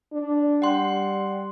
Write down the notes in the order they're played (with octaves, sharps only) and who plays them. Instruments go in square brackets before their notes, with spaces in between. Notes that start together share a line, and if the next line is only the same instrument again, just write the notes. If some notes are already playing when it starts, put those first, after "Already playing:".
[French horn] D4
[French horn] G3 [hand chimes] F#5 G5 C6